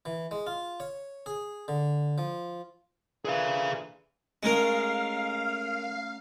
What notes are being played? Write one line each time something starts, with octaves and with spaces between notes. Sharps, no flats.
E3
G#3
F4
C#5
G#4
D3
F3
A#2 D3 E3 G#4 F5
G#3 A3 C#4 D#4 A#4 F5